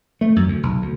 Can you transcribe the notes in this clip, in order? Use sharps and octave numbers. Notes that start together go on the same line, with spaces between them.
A3
F#2
D2
B1
D2